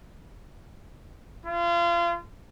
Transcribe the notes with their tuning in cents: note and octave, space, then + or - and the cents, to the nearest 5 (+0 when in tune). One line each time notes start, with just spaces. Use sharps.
F4 -30